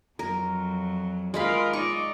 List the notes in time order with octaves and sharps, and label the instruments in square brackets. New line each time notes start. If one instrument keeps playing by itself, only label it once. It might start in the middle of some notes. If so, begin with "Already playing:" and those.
[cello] F2 F#3 [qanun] A#4
[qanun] G#3 F5 B5 [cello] F4 A#4
[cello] D#4 D5 [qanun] C#6